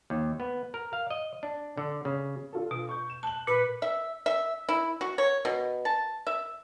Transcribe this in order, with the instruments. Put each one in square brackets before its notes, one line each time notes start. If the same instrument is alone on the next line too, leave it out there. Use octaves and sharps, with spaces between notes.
[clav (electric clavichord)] D#2
B3
A#4
F5
D#5
D4
D3
C#3
[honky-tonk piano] D4 F4 A4
[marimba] B2
[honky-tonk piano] C#6 G6
E7
[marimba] A5 [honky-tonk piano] F#6 F#7
[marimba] A#2 [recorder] B4
[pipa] E5
E5
E4
F#4
C#5
B2
A5
E5